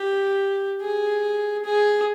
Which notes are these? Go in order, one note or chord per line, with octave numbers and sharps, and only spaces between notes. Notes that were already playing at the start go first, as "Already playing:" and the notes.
Already playing: G4
G#4
G#4